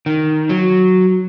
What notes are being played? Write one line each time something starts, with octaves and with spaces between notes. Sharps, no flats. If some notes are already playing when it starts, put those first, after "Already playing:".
D#3
F#3